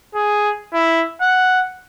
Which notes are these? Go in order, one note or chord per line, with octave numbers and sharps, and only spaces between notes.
G#4
E4
F#5